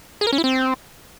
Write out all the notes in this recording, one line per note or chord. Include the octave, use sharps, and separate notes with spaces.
G#4
A#4
C#4
E4
C4